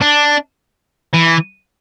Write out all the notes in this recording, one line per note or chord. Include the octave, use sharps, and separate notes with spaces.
D4
E3